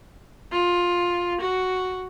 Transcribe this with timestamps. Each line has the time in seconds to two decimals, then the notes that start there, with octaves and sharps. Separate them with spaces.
0.52 F4
1.42 F#4